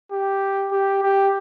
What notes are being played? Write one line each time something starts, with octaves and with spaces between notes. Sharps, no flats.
G4
G4
G4